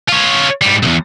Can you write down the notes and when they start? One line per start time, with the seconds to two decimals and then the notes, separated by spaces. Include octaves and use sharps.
0.09 F4 C#5
0.62 G#2 G3
0.83 B1 E2